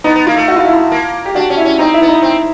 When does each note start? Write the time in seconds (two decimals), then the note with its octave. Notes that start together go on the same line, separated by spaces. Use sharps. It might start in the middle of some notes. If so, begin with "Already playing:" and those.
0.04 B3 D#4
0.16 B3
0.26 A#3 F4
0.37 A3
0.48 F#4
0.56 F4
0.65 E4
0.73 F4
0.92 A#3
1.25 G4
1.35 D4 F#4
1.50 C#4
1.57 E4
1.65 C#4
1.79 C4 D#4
1.94 E4
2.02 B3
2.08 D#4
2.22 C4